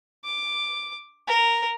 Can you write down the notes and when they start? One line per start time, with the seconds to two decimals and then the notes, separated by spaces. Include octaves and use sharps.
0.24 D6
1.27 A#4